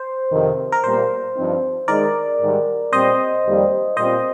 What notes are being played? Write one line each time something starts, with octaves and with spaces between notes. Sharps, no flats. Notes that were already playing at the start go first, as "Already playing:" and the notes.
Already playing: C5
F2 C3 D#3
A#4
A#2 G3 A#3 C5
G2 F3 C4 D#4
D#3 G#3 D#4 A#4 D5
G#2 D#3 G3
A#2 G3 C4 C5 D#5
F2 D#3 G3 A#3
A#2 G3 C4 F4 C5 D#5